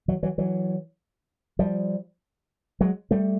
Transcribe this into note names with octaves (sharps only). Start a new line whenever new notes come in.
E3 F#3
E3 F#3
E3 F#3
F3 G3
F#3 G#3
G3 A3